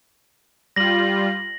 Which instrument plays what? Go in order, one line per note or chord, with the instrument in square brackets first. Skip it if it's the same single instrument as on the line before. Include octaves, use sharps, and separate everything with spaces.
[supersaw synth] G3 F4 [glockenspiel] A#6 F#7